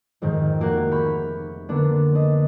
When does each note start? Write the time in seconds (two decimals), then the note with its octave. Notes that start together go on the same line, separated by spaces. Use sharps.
0.22 F2 G#2 D#3
0.60 F1 F3 A#3 F#4 A#4 F#5
0.92 B5 C#6 F6 G6
1.69 D3 A#3 B3 D4
2.15 D4 D#5